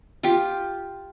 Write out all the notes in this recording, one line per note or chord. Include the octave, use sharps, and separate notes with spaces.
F4 G4